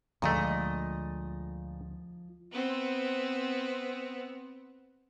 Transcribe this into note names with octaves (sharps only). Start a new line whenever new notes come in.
D2 A#2 D3 F3 G#3 A3 D#5
B3 C4